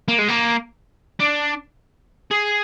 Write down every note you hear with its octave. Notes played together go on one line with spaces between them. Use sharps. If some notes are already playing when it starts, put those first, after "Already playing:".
A#3
G#3
A#3
D4
G#4